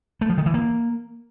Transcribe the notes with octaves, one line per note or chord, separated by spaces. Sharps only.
A3
F3
D#3
E3
A#3